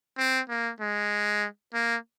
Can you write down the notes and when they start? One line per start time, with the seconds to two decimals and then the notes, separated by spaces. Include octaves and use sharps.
0.18 C4
0.50 A#3
0.81 G#3
1.74 A#3